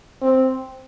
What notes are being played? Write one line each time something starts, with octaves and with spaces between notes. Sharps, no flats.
C4